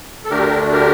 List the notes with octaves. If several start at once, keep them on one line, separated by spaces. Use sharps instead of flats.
A4
D2 D3 A3 D4 G4 A#4
G4 A#4